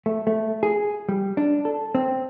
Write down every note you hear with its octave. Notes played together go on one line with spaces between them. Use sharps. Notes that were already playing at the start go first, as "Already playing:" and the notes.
A3
A3
G#4
G3
D4
A4
C4